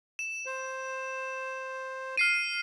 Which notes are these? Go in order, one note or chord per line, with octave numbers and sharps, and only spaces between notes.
E7
C5
F6 C7 D#7